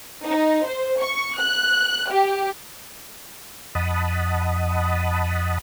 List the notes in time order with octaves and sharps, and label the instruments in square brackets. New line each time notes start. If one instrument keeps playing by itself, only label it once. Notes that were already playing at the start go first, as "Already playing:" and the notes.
[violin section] D#4
C5
C#6
F#6
G4
[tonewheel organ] F2 D#5 F#5 A5 B5 D#6